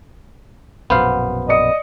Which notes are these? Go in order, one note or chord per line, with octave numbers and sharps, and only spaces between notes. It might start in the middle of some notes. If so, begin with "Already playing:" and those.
A#1 F#2 B2 B3 C5 F5 F#5
D5 D#5 D#6 C#7